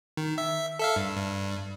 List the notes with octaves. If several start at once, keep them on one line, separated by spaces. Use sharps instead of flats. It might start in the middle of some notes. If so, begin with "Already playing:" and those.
D#3
E5
A4 E5 F5
G2
G2